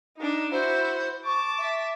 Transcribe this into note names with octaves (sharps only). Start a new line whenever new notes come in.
D4 D#4
E4 F#4 C5
A5 C#6 D6
E5